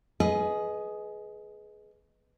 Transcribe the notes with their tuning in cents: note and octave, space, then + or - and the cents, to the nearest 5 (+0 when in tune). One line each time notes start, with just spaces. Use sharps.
G#4 +25 B4 +0 D#5 +5